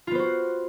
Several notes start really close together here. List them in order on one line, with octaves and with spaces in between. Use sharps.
F4 B3 C5 F#4